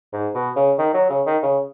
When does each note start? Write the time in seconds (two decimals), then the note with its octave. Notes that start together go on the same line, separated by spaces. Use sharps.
0.13 G#2
0.34 B2
0.56 C#3
0.78 D#3
0.94 F#3
1.10 C#3
1.26 D#3
1.43 C#3